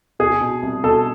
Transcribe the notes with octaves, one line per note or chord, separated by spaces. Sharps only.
B2 G#4
B2
C2
B2 A4